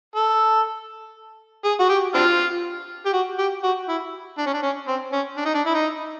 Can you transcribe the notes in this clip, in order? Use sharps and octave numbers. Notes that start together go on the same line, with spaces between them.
A4
G#4
F#4
G4
C4 D4 F4
G4
F#4
G4
F#4
E4
D4
C#4
D4
C#4
C4
C#4
D4
D#4
D4
E4
D#4